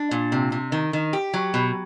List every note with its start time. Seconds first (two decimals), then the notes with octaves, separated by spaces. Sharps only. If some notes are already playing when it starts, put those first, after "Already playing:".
Already playing: D4
0.11 A#2
0.32 C3
0.52 C3
0.72 D#3
0.93 D#3
1.13 G4
1.34 F#3
1.54 B2